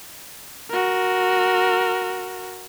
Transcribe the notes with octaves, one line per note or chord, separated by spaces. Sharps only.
F#4 A#4